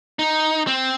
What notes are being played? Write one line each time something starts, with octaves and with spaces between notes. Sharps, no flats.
D#4
C4